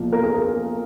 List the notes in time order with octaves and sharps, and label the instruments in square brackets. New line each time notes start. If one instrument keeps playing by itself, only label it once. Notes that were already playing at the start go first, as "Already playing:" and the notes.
Already playing: [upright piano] B1 A#2 F3
A#4
G#4
A#4